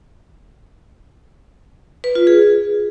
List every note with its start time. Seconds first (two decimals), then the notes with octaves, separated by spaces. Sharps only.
2.04 B4
2.15 F4
2.27 G#4